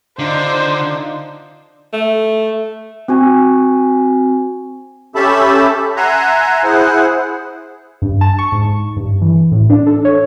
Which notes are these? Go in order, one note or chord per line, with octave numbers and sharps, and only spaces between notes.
D3 D4 D#4 F4 C5
A3
C4 F#4 G#5
C#4 G4 A4 E5 A5 B5
E5 F#5 G#5 A#5 C6
E4 G#4 C5 F#5
G2
A5
C#6
G#2
G2
E3
A2
D4
A4
C#5